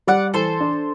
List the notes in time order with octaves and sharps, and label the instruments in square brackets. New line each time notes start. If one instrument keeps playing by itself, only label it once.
[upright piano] G3 [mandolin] D5 F#5
[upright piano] E3 [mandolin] A4 C5
[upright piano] D4